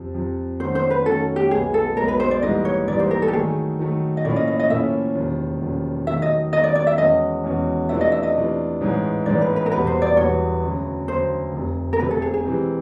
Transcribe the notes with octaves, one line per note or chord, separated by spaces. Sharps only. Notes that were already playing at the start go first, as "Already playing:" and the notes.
Already playing: F2 C3 F3
F2 C3 F3
D#3 F#3 A3 C#4 F#4 C5
C5
B4
D#3 F#3 A3 C#4 F#4 A4
G4
B1 B2 G#3 B3 G#4
A4
B1 B2 G#3 B3 A#4
B4
C5
D5
G#2 E3 G3 A#3 D#5
C#5
G#2 E3 G3 A#3 D5
C5
A#4
A4
G4
D#3 F#3 A3 G#4
D#3 F#3 A3
D#5
A2 F3 A#3 C#4 E4 D5
D#5
D#5
D#5
A2 F3 A#3 C#4 E4 E5
E1 D#2 C#3 F3
E1 D#2 C#3 F3
D#3 F#3 A3 E5
D#5
D#3 F#3 A3 D#5
D5
D5
E5
E2 B2 G#3 C#4 F#4 D#5
E2 B2 G#3 C#4 F#4
C3 E3 A3 D4 F4 E5
D#5
E5
D#5
C3 E3 A3 D4 F4
A1 G#2 E3 G#3
A1 G#2 E3 G#3 D5
B4
B4
A#4
E1 E2 B2 G3 B3 B4
C5
D5
E1 E2 B2 G3 B3 C#5
D2 C#3 F#3
D2 C#3 F#3 C5
F1 F2 C3
A#4
F1 F2 C3 B4
A4
G#4
G#4
C3 E3 G#3 C4